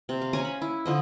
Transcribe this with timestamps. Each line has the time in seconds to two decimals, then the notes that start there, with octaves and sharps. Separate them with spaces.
0.09 C3
0.22 F5
0.33 C#4 C#5 G#5 A#5
0.45 B5
0.62 E4
0.86 D3 F3 D#5